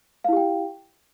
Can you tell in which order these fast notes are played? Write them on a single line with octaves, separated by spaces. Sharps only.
F5 E4 G4 G5